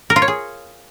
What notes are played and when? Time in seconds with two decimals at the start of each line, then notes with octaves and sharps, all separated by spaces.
0.10 A#4
0.16 F4
0.22 C#5
0.28 G#4